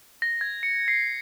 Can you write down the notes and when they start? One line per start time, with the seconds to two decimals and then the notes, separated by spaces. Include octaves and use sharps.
0.22 A#6
0.41 G#6
0.63 C#7
0.88 C7